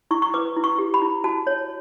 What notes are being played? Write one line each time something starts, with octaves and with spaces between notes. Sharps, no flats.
E4 C#6
C#6
B4 D6
E4
C#6
G4
B5
E4
F#4 A5
C#5